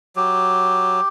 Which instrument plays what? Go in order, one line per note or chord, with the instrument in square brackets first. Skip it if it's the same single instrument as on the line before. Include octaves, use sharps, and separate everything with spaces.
[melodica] F#3 G4